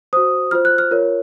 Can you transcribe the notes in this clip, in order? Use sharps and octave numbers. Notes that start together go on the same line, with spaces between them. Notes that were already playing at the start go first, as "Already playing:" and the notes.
F#4 C5 D#6
F4 C5 F6
F#6
F6
F4 A#4 C#5